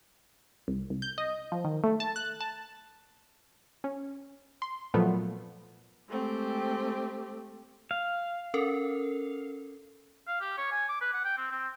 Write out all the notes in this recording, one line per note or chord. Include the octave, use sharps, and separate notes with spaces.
C2
C2
G6
D#5
F3
D#3
A3
A5
F#6
A5
C#4
C6
A#2 F3 F#3 A3 B3
G#3 A3 C4 G4
F5
C#4 A4 A#4
F5
G4
C#5
G#5
D6
B4
F#5
G5
C4
C4